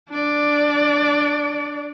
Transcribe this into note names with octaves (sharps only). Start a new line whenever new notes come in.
D4 D5